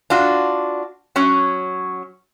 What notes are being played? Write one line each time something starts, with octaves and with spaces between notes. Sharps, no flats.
D4 F4 F#4
F#3 C#4